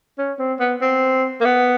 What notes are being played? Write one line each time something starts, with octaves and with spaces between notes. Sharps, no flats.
C#4
C4
B3
C4
A#3
B3